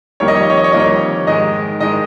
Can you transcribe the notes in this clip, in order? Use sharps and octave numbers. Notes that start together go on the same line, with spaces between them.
F2 D#3 G3 A#3 C#5
D#5
C#5
D#5
C#5
D#5
C#5
F2 D#3 G3 A#3 D#5
C#5
G#2 D#3 G#3 D#5
G#2 D#3 G#3 D#5